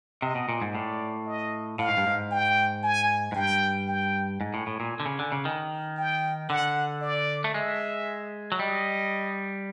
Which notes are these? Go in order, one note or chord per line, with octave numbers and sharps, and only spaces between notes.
C3 D#5
B2
A#2
G#2
A2 D5
D#5
A2 F5
G#2
G2
G#2
G5
G#5
G#2
G2 G5
G5
G#2 G#5
A2
A2
A#2
D3
C#3
D3
C#3
D#3
G5
D3 F#5
D5
A3
G#3 E5
F#3
G3 D#5